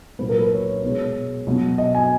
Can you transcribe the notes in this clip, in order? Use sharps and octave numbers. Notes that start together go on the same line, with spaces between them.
A#2 F#3 B4
A#4
B4
C#5
C#5
B2 G#3 C#5
B2 F#3
D#5
G#5